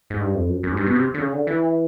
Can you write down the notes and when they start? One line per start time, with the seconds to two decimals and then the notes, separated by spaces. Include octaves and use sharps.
0.10 G#2
0.21 G2
0.35 F2
0.49 F#2
0.63 F#2
0.72 G#2
0.77 G2
0.87 B2
0.95 C3
1.14 D3
1.19 C#3
1.33 D3
1.47 E3